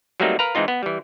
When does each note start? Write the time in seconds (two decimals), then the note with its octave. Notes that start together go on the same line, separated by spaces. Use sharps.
0.20 F#3 G3 A3 A#3 C4 D#4
0.39 A#4 B4 F5 A#5
0.55 E3 G#3 C4 D#4 F4
0.68 B3
0.83 E3 G3